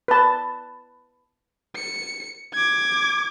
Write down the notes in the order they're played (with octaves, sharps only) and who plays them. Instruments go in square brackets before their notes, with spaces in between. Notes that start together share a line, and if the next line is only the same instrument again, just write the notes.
[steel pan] B4 A5
[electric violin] C#7
D6 G#6